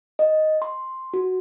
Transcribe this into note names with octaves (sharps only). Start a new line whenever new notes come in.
D#5
C6
F#4